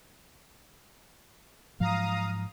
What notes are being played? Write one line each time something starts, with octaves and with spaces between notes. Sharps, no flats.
G#2 F3 F#3 F5 A#5 D#6